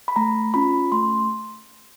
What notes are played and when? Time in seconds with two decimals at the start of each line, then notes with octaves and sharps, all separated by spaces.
0.08 B5
0.16 A3 A#5
0.54 C#4 F4 B5
0.92 A3 C6